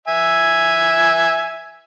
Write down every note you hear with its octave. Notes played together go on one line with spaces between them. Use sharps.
E5 G#5